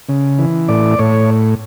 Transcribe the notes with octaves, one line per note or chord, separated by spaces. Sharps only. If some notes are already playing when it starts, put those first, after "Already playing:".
C#3
E3
A2 D5
A2 C#5